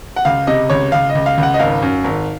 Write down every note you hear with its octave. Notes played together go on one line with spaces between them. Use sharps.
F#5
C#2 F5
C3 D#5
C#2 C#5
C#2 F5
D#5
C#2
F5
C#2 F#5
D#5
G#1 F5
F#2
G#1